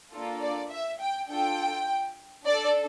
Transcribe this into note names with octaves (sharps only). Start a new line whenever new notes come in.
A#3 D4 F4 A4
D5
E5
G5
D4 F4 A4 G5
D4 A4 D5